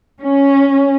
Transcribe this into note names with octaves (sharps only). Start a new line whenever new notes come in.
C#4